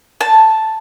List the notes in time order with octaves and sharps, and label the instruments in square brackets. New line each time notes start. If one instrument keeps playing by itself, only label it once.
[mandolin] A5